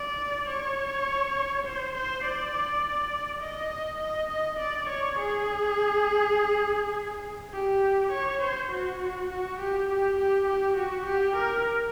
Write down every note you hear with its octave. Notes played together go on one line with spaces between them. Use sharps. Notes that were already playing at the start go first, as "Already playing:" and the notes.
Already playing: D5
C#5
C5
C5
D5
D#5
D#5
D#5
D5
C#5
G#4
G4
C#5
C5
F#4
F#4
G4
G4
G4
G4
F#4
G4
A#4